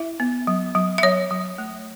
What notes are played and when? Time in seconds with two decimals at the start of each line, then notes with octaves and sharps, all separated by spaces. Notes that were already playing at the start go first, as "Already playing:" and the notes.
Already playing: E4 E5
0.20 B3
0.47 F#3
0.75 F#3
0.98 E5
1.03 F#3 C#5
1.31 F#3
1.58 A3